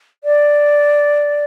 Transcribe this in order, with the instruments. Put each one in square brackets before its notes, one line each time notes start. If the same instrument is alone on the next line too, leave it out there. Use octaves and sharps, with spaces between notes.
[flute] D5